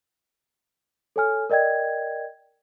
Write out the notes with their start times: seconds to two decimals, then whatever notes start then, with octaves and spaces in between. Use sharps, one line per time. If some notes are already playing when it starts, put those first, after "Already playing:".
1.16 A4 C#5 G#5 F6
1.50 A#4 D5 D#5 G5 G#6